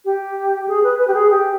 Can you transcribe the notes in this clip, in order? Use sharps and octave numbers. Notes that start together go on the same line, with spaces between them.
G4
G#4
B4
B4
G4
G#4
G4